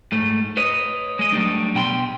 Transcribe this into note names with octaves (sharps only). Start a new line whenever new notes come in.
G#2 A3
B4 C#5 D#5
G#3 D#5
F#3 G3 A3 D4
B2 G5 B5 C6